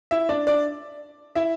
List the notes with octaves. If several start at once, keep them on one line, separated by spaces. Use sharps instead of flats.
E4 E5
D4 D5
D4 D5
E4 E5